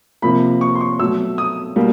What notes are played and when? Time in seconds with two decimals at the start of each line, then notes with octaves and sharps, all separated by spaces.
0.22 C3 F3 A#3 B5
0.61 C#6
0.75 C6
0.81 C#6
0.99 B2 F#3 A3 E6
1.38 D#6
1.76 B2 G3 A#3